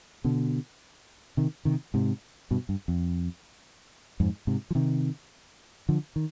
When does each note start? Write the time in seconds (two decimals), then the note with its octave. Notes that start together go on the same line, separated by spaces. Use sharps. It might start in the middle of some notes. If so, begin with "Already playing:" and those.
0.24 B2 D3
1.37 C3 D#3
1.65 C3 D#3
1.94 G#2 C3
2.51 G2 B2
2.69 G2
2.88 F2
4.20 F2 G#2
4.47 G#2 C3
4.71 F3
4.75 C3 D#3
5.89 D3 F3
6.16 D#3